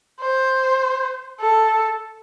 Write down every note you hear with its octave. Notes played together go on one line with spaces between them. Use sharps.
C5
A4